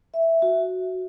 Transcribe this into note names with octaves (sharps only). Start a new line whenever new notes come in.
E5
F#4